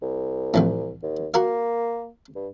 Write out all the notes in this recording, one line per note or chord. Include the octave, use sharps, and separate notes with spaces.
C2
A1 F2 A2
D#2
A#3 F#4 A#4 F5
G2